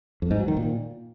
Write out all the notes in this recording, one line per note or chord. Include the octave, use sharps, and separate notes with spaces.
F2
G#2
F#3
D#3
A#2